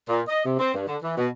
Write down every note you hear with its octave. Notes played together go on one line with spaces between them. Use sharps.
A#2
D#5
C3
C4
G2
D3
E3
B2